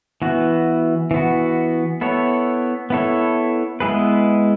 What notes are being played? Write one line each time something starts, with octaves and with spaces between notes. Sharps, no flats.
E3 B3 F#4
E3 B3 F#4
B3 E4 A4 C#5
B3 E4 A4 C#5
G#3 B3 E4 G#4 B4